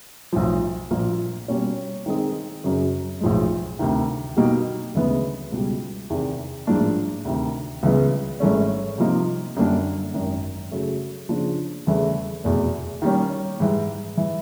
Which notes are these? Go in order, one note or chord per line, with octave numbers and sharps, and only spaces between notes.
B1 A2 F3
A#1 A#2 F3 A#3
B2 G3 A#3 C#4
D#3 G#3 C4 D#4 G#4
F#2 C#3 F#3
B1 A2 F3 G#3
D2 C3 D#3
B2 F#3 A#3 D#4 G4
D2 C#3 E3 G#3 B3
C#2 B2 G3
E2 C3 D#3
A1 G#2 F3 A#3 D4
D2 C3 D#3
C#2 C#3 E3 G#3 B3
G#1 G#2 E3 A3 C#4
C3 F3 A#3 D#4
F#2 D3 G3 A#3 D4
G#1 F#2 D#3
C#3 F#3 A3
C#3 F3 A#3 D4
E2 C#3 E3 A3
F1 E2 B2
D#3 G3 A#3 C#4
G#2 E3 G3
E3